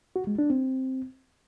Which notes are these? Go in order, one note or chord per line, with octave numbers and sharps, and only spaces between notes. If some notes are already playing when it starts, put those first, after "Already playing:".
F#4
G#3
D4
C4